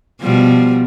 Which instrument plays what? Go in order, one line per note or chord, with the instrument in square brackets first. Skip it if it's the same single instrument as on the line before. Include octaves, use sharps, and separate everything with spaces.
[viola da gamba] B2 F3 G3